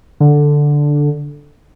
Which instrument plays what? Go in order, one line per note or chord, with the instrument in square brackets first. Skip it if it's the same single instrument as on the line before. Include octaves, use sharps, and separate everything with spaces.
[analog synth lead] D3